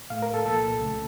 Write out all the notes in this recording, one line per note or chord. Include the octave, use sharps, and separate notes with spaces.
A2 A3 F5
A#4
A4
C2 A#2 F3 A#3 A4
C#2 C#3 A3